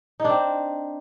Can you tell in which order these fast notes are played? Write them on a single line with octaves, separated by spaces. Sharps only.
D#4 D4 C4